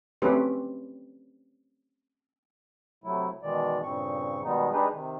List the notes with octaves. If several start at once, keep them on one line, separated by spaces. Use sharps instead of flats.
A3 C4 C#4 G4 B4
C3 F#3 A3 E4
B2 D#3 E3 G#3 D5
G2 A#2 C#3 C4 C#6
B2 D#3 G3 G#3 B3 D#4
G#3 D4 D#4 G4 G#4 B4
C3 D#3